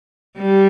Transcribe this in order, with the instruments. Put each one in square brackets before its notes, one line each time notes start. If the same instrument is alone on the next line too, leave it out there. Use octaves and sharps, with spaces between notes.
[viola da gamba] G3